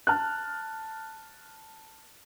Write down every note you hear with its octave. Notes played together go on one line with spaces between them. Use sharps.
A5 F6 F#6